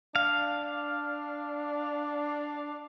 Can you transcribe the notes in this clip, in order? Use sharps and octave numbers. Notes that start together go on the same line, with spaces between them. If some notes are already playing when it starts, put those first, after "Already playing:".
D4 F5